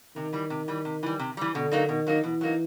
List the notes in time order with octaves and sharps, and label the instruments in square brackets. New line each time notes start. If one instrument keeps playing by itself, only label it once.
[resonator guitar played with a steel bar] C3 [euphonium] D#3
[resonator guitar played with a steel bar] E3 G3
C3
E3 G3
C3
E3 G3
C3
E3 G3
[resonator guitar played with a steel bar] B2 [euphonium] D3
[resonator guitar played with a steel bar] F#3 A#3 D#4
[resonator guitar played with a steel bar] B2 [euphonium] D#3
[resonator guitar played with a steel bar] F#3 A#3 D#4
[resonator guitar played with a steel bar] B2 [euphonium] E3
[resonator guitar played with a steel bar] F#3 A#3 D#4